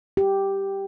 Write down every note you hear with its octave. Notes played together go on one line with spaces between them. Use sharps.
G4